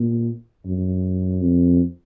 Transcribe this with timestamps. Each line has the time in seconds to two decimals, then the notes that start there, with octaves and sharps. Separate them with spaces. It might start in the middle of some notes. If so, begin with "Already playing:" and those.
Already playing: A#2
0.66 F#2
1.42 F2